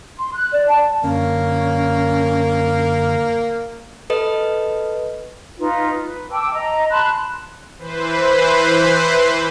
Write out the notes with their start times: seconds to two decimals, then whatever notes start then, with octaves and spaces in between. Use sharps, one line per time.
0.19 C6
0.34 F#6
0.53 D5
0.68 A5
1.03 F#2 D3 A#3 C#4
4.10 A4 B4 D#5
5.59 D#4 F4 B4
5.99 B4
6.30 G5 A5 D6 E6
6.53 D#5 A#5
6.90 A5 B5 C6 F#6
7.79 E3 B4 C5